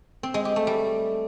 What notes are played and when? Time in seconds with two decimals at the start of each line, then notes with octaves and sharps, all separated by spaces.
0.23 C4
0.34 G#3
0.45 G4
0.56 A3
0.67 G3